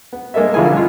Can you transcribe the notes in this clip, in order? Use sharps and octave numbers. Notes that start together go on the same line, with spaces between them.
B3
G#3 A#3 A4 D#5 E5
A#1 D3 E4 F4 G#4 G#5
G#3 F4